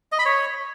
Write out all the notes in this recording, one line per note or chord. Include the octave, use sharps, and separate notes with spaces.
D#5
B5
C#5